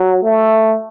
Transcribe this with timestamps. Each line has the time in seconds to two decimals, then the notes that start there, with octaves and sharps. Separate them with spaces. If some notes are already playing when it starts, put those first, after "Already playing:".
Already playing: F#3
0.22 A3